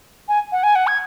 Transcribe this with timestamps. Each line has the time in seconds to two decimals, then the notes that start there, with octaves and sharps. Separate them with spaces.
0.28 G#5
0.52 F#5
0.63 G#5
0.75 F#5
0.87 G#6